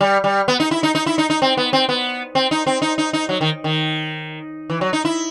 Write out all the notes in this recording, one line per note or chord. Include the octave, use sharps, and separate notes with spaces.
G3
G3
B3
D#4
E4
D#4
D#4
E4
D#4
D#4
C4
B3
C4
B3
C4
D#4
C4
D#4
D#4
D#4
F#3
D#3
D#3
E3
F#3
D#4
E4